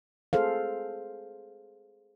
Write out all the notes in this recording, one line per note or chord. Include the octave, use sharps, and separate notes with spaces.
G#4 A4 C5 F5